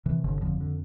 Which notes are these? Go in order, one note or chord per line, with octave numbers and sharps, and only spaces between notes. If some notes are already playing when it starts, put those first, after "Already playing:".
C3 E3
G1 D3
F2 D3 F3
D3